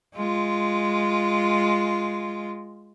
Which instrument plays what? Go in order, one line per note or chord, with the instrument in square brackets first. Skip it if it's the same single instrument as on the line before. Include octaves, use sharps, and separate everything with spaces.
[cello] G#3 F4